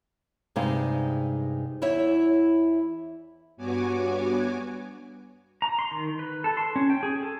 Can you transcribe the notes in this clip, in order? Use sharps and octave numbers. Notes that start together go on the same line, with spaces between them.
G2 C3 G#3 D#4 F5
E2 E4 C#5 E5
G2 B3 F#4 C#5 G#5 D6
A#5
C6
D#3
B4
A4
C6
C#4
G5
G#4
A4